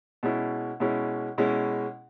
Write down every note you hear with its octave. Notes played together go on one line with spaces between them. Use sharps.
B2 G#3 C#4 E4
B2 G#3 C#4 E4
B2 G#3 C#4 E4